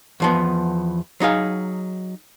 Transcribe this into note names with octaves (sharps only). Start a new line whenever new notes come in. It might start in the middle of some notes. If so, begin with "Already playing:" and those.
E2 F3 B3
F#3 D#4 G#4 F5